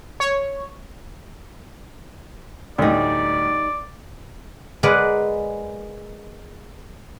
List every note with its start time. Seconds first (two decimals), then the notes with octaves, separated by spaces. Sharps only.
0.20 C#5
2.78 D2 A2 G3 D#4 D5
4.83 G#3 G#4 A#4 B4 D5 F#5